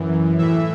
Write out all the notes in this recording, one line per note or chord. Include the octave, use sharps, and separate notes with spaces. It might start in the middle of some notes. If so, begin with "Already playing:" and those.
Already playing: F#2 E3
A2 E3 E5